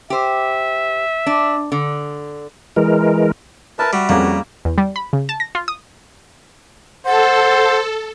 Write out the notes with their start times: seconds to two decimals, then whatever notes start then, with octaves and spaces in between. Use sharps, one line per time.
0.10 G4 C5 E5
1.26 D4
1.72 D3
2.76 E3 G#3 A#4
3.79 A#4 B4 E5 A5 A#5
3.93 G3 F#4
4.09 F2 G3 A#3 C#4 G#4
4.65 E2
4.78 G3
4.96 B5
5.13 C#3
5.29 A5
5.40 A#6
5.55 F4
5.68 D#6
7.06 A4 C5 F#5